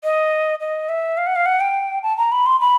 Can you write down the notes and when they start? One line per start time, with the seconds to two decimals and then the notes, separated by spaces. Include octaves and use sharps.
0.04 D#5
0.60 D#5
0.89 E5
1.17 F5
1.26 F#5
1.36 F5
1.46 F#5
1.60 G5
2.03 A5
2.17 A#5
2.32 B5
2.46 C6
2.60 B5